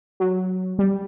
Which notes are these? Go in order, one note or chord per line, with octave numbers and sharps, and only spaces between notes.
F#3
G3